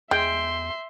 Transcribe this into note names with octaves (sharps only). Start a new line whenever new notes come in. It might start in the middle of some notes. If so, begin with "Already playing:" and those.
E2 G#3 E5 G5 C6